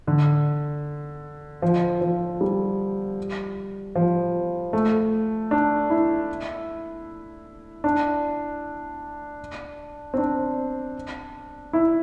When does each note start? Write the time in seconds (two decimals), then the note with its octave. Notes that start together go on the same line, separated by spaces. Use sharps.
0.07 D3
1.62 F3
2.01 F3
2.41 G3
3.95 F3
4.73 A3
5.51 D4
5.90 E4
7.84 D4
10.14 C4
10.18 D4
11.73 E4